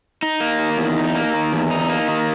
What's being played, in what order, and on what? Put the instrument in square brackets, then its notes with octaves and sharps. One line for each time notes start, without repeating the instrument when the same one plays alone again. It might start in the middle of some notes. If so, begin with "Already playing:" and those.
[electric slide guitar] D#4
A#3
D#3
E2
D#4
A#3
D#3
E2
D#4
A#3
D#3